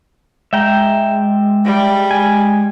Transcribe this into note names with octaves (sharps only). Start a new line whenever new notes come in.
G#3 E5 G5 A#5
G3
G#5